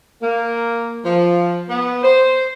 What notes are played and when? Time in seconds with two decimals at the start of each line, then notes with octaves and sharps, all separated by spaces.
0.22 A#3
1.05 F3
1.70 B3
2.03 C5